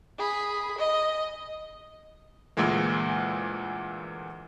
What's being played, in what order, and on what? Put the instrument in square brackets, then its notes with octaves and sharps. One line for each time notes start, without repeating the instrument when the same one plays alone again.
[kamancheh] G#4 B5
D#5
[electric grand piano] D2 A#2 E3 G#3 A#3